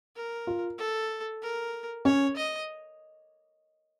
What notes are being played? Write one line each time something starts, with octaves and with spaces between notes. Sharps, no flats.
A#4
F4
A4
A#4
C#4 C#5
D#5